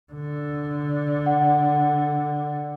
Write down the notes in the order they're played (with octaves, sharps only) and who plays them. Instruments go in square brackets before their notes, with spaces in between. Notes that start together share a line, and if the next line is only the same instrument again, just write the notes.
[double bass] D3
[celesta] F#5